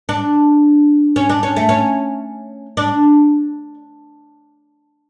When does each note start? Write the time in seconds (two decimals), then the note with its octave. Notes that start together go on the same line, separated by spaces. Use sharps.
0.09 D4
1.16 C#4
1.29 D4
1.43 C#4
1.56 A3
1.69 C#4
2.77 D4